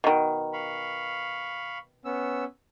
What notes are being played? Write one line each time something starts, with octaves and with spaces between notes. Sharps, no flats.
B2 D#3
F5 B5 C#6
B3 C#4 E6